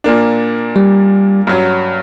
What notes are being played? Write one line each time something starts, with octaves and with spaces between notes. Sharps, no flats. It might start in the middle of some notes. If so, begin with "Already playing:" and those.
A#2 A#3 D4
G3
G2 F#3 C#4